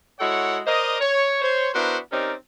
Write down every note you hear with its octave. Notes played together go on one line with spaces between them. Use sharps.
G#3 E4 F#4 A4 C#5 F#5
A#4 C5 D5 D#5
C#5
C5 C#5
B3 D4 E4 F#4 A#4 C5
C4 C#4 D#4 G4 A#4 D5